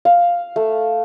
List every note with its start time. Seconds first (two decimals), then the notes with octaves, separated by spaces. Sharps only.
0.05 F5
0.56 A3